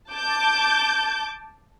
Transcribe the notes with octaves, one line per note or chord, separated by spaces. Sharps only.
A5 D6 G6